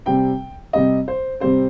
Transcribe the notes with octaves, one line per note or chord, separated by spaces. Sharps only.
C3 G3 C4 G5
C3 G3 C4 D#5
C5
C3 G3 C4 C5